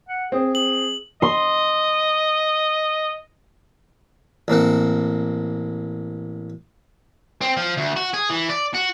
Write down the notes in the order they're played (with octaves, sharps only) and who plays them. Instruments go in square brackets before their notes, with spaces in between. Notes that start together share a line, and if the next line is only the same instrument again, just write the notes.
[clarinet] F#5
[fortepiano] C4 [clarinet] G#4
[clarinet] G#4 [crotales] F#7
[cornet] D#5 [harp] C6
[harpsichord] A1 A#3 C4 F#5
[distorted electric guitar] C4
F3
D2
F#4
G#4
E3
D5
F#4